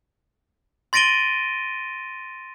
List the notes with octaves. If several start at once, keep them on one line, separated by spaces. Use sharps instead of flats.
C6 A6 A#6 D7 D#7 G7